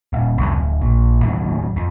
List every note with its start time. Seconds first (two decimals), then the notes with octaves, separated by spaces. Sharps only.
0.13 D#1
0.38 C2 F2
0.56 D1
0.82 A#1
1.22 D#2 A2 D#3 F#3
1.76 F2